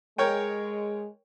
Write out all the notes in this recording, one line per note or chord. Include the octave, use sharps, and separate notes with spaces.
G#3 A#4 C#5 G5